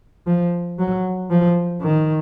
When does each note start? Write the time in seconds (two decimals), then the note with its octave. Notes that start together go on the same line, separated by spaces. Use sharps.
0.26 F3
0.78 F#3
1.30 F3
1.81 D#3